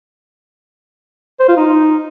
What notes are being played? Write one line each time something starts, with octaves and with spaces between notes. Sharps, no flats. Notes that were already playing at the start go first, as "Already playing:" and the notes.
C5
F4
D#4